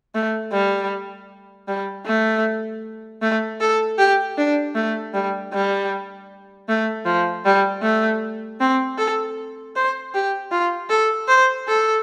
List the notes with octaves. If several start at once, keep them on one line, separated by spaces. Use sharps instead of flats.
A3
G3
G3
A3
A3
A4
G4
D4
A3
G3
G3
A3
F3
G3
A3
C4
A4
C5
G4
F4
A4
C5
A4